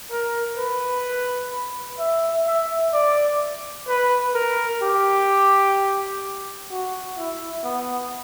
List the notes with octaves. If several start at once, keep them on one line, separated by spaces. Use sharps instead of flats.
A#4
B4
E5
E5
D5
B4
A#4
G4
F#4
E4
B3